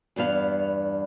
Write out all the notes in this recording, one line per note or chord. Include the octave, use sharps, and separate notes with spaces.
E2 G2 B3 F5